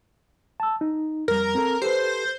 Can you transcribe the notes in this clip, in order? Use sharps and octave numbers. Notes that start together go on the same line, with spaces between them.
A5 E6
D#4
F2 G3 A#4
C4 A4
G4 A4 B4 C5